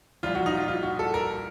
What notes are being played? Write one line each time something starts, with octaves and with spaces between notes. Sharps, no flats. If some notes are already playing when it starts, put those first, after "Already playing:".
C2 A#2 F3 F4
F#4
D#4
F4
F4
F#4
A4
A#4